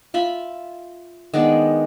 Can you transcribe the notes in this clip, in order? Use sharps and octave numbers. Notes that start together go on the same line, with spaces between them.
F4 E5 B5
D#3 G#3 B3 D4